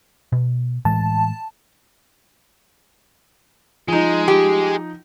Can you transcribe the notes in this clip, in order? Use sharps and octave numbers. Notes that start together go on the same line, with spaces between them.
B2
A2 E3 G#3 A5
F3 G#3 D#4
G4